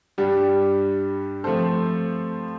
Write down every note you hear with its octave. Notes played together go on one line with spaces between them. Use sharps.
G2 G3 D4 G4
F3 A3 C4 A4 C5